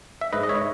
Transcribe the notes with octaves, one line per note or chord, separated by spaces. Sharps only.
E5
G#2 B4 D#5
D#5
C#5 E5